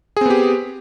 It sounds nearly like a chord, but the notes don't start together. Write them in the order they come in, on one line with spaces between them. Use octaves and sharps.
G#4 C4 B3 G4